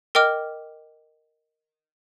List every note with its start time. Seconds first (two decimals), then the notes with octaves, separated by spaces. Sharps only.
0.15 A#4 D#5 G5 D6 F6